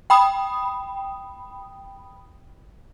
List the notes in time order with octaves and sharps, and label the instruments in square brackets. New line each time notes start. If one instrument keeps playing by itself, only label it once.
[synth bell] G5 B5 D#6